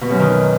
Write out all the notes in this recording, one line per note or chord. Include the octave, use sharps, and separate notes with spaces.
B2
F#2
D#3